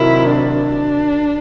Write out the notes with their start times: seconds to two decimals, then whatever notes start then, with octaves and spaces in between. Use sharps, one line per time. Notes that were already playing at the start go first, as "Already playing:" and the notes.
Already playing: C3 D#3 F#3 E4
0.31 D4